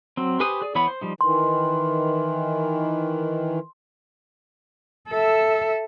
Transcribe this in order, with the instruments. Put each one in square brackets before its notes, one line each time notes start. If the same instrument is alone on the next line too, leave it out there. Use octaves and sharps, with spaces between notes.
[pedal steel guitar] F#3 C4
G4 B4 C5 G#5 D#6
G#4 D5
E3 B3 C#5 B5
C5
F3 G3 D#4
[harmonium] D#3 E3 [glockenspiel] C6
[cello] A4 E5